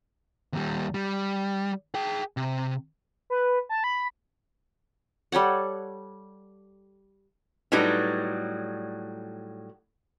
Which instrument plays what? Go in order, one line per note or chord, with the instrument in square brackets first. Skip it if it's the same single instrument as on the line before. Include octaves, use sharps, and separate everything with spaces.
[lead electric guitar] D#2 G3
G3
G#4 G5
C3
[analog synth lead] B4
A5
B5
[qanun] G3 A4 C#5 F#5
[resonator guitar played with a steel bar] A2 F#3 G3 D#4 B4